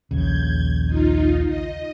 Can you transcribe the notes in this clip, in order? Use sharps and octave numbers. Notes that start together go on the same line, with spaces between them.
A#1 D#2 C#3 G6 G#6
D#4 F4
D#5